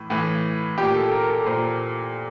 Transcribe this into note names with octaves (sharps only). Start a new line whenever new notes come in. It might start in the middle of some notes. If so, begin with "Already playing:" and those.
Already playing: A2 E3
A2 E3
A#2 G4
A4
A#4
A4
A#2 C5